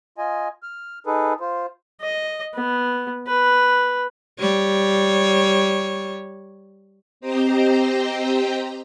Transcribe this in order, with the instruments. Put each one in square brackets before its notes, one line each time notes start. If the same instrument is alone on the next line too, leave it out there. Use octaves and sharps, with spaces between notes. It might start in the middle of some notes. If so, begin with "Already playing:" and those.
[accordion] F4 D#5 G#5
F6
D#4 G#4 A4 B4
F4 C5
[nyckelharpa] D#5
B3
B4
[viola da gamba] G3 C#5
[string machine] C4 G4 C5 D#5 G5 A#5